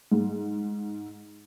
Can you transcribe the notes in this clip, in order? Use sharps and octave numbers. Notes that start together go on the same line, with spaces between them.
G#2